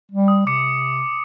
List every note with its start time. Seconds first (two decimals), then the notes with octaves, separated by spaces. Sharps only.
0.12 G3
0.28 D#6
0.47 C3 D6 C#7